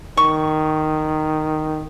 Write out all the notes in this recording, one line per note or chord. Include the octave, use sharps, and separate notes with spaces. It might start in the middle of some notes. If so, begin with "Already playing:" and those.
D#3 C#6